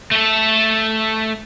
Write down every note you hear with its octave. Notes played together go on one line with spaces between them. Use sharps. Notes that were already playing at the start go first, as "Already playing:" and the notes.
A3 A4